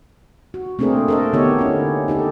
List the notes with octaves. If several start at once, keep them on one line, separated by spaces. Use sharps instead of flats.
F#4
A3 A#3 C4 D4 G#4 A#4
A4 A#4 D#5
D3 B3 D#4 G4 C#5
C#4 E4
D#4 G4 A4